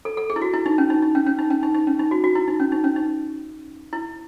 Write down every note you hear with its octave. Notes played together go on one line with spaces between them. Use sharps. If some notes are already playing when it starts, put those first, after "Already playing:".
A4
A4
G#4
E4
F#4
E4
D#4
C#4
D#4
D#4
C#4
C#4
D#4
C#4
D#4
D#4
C#4
D#4
F#4
F#4
E4
D#4
C#4
D#4
C#4
D#4
E4